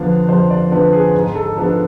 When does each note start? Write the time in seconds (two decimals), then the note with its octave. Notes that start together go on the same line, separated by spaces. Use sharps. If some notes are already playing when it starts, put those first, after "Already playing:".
Already playing: F2 D3 F3 B3 D4 F5
0.29 F2 C5
0.50 D5
0.71 D3 F3 B3 D4 B4
0.93 G#4
1.14 G#2
1.35 A4
1.57 F3 B3 D4 A4